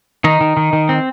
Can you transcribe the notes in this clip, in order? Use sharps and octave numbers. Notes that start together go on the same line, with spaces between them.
D#3 D#4
D#3
D#3
D#3
C4